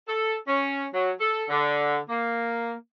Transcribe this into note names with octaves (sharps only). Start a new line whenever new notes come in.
A4
C#4
F#3
A4
D3
A#3